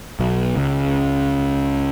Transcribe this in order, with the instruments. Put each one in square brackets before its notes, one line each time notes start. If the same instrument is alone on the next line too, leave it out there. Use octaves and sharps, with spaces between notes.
[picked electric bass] B1 B2
C#2 C#3